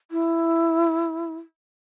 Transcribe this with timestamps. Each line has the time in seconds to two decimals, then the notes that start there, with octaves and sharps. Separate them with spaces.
0.11 E4